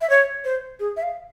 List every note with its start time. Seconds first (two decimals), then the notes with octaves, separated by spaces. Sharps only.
0.01 E5
0.10 C#5
0.45 C5
0.80 G#4
0.97 E5
1.03 F5